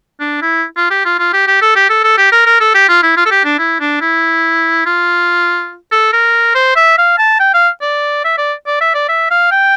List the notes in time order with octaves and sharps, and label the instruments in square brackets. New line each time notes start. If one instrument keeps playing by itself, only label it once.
[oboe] D4
E4
F4
G4
F4
F4
G4
G4
A4
G4
A4
A4
G4
A#4
A#4
A4
G4
F4
E4
F4
A4
G4
D4
E4
D4
E4
F4
A4
A#4
C5
E5
F5
A5
G5
F5
D5
E5
D5
D5
E5
D5
E5
F5
G5